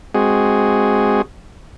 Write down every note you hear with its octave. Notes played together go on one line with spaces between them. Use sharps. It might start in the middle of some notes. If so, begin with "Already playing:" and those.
G#3 C4 F#4 G#4